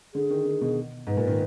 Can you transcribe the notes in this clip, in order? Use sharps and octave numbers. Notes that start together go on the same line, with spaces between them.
D3 G#4
D#3
D#3
B2
G#2 B4
A#2
D#3